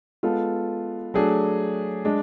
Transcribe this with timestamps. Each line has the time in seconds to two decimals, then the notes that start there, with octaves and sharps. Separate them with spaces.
0.23 G#3 B3 F4 A4
1.14 F#3 A3 D4 G#4
2.05 G#3 D4